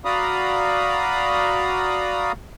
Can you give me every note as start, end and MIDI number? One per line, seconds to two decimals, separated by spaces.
0.05 2.32 66
0.05 2.32 74
0.05 2.32 77
0.05 2.32 82
0.05 2.32 83
0.05 2.32 87